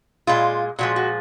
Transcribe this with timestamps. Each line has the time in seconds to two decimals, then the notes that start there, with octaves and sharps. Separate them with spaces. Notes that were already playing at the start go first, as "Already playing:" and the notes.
0.27 A#2 G#3 F4
0.79 A#2 F3 G#3 F#4
0.96 F#4